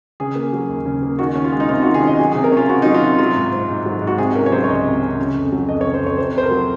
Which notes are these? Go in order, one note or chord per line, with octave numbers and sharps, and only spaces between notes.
C#3 G#4
A#3
F#3
D#2
C#3
A#3
D#3 F#4
C#4
F4
G#3
D#4
C3 F4
F#4
D#3
G#4
C#4 D#5
F#3 G#4
G#4
C3
A#4
C#4
F4
C3 F#4
F#3 D#4
F4
C3
F#3 F4
G#2
C4
G#2
F#3
G#2
F#4
C3 G#4
C#4 A#4
C#5
F#3 C5
C#5
C#2 D#5
C3
C#4
C#3
F2
F#3
F2 D#5
C#5
C#3
C5
F2 C#5
C3 C5
F2 C5
A#4
F#3